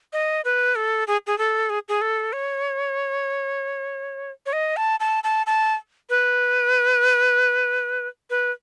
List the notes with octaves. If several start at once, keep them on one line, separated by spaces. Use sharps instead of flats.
D#5
B4
A4
G#4
G#4
A4
G#4
G#4
A4
C#5
C#5
D#5
A5
A5
A5
A5
B4
B4